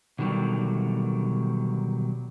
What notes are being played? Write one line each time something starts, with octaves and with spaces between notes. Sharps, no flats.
B2 D3 D#3 F#3 G3